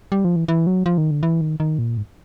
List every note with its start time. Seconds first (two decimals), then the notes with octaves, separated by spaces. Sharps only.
0.12 G3
0.25 F3
0.36 E3
0.48 E3
0.67 F#3
0.86 F3
0.98 D#3
1.11 D3
1.23 E3
1.41 D#3
1.60 D#3
1.79 A#2
1.97 G#2